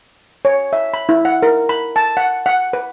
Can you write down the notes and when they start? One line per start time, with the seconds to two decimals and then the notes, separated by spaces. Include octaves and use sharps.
0.45 C#5
0.73 E5
0.94 B5
1.09 E4
1.25 F#5
1.43 A#4
1.69 B5
1.96 A5
2.17 F#5
2.46 F#5
2.73 B4